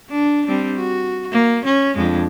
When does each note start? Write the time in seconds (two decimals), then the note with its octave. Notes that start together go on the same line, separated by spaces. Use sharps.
0.10 D4
0.46 G3 C4 D4
0.76 F#4
1.32 A#3
1.65 C#4
1.96 F2 G#3 D4